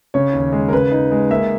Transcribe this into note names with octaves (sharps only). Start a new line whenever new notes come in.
C#3 C#5
D#2
G#3
A#4
C#3 B4
D#4
G#3
A#3 E5